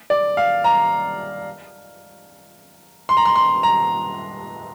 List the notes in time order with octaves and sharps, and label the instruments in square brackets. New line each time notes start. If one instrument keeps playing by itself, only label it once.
[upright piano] D5
F5
A#5
C6
A#5
C6
C6
A#5